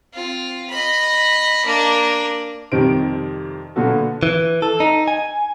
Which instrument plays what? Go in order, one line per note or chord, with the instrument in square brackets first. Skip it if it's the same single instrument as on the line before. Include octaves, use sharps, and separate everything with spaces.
[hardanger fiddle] C4 F4
D#5 B5
A#3 D4
[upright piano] F2 C3 D#3 G3 C5 D7
A#2 D3 B3 F#4 A4
[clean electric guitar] E3
A4
D#4
G#5